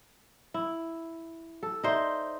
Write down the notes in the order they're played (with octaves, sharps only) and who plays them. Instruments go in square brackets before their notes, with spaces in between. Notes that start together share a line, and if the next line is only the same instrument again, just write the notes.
[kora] E4
A4
[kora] D#4 C5 [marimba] D5 E5